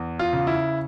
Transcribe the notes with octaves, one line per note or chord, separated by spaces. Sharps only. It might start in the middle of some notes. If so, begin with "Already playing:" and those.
Already playing: E2
F4
C#3
E4